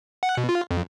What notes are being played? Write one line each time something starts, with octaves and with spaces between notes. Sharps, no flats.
F#5
B2
F4
F2